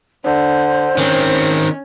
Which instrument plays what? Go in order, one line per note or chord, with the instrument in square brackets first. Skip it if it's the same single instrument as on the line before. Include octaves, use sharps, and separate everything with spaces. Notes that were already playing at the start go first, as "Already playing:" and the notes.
[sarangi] D3 [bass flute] C5
[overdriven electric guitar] D#3 C4 [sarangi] C#4